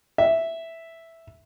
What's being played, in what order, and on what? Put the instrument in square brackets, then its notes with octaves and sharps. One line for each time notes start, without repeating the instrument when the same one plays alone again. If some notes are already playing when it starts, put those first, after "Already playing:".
[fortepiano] E5